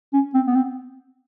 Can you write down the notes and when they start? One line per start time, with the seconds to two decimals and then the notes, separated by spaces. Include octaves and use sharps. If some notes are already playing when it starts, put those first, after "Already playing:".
0.13 C#4
0.34 C4
0.47 B3
0.56 C4